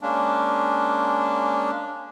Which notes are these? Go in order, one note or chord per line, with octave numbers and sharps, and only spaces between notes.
G#3 A#3 C#4 D4